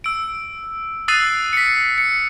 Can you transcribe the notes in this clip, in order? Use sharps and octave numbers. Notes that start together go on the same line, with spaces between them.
E6 D7
D#6 E6 F#6 A6 C7 D#7
B6 C#7
C#7